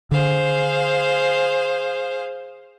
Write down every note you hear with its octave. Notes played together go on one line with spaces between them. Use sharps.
D3 G#4 C5 F5